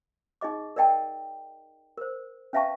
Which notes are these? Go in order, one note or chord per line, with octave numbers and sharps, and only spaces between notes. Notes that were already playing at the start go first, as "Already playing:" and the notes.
D#4 G#4 D#5 D6
A#4 D5 D#5 G5 A5
A#4 C5
C#4 B4 E5 F5 A5 C#6